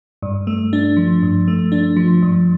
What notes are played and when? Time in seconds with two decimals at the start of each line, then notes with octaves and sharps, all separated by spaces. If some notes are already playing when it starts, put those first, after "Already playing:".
0.22 G2
0.47 A3
0.73 D4
0.97 F3
1.23 G2
1.48 A3
1.72 D4
1.96 F3
2.22 G2